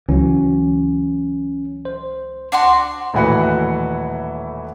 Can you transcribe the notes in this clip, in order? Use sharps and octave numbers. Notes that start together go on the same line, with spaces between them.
C#2 E3 F#3 C#4
C5
D4 F#4 C6
D#1 A2 E3 F#4 B4 F#5